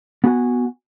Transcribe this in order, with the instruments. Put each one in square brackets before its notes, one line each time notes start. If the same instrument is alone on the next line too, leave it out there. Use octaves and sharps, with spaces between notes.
[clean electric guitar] B3 F#4 F#5 G#5